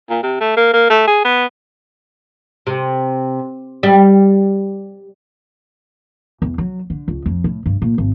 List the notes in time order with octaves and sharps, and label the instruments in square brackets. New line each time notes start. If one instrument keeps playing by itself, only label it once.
[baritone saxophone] A#2
C3
A3
A#3
A#3
A3
G#4
B3
[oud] C3
G3
[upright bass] E2
F#3
D3
C#2
F2
A2
G2
A#2
G#1